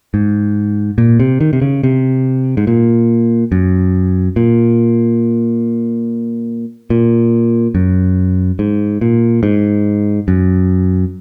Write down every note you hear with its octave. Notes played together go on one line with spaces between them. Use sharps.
G#2
A#2
C3
D#3
C3
C#3
C3
G#2
A#2
F#2
A#2
A#2
F#2
G#2
A#2
G#2
F#2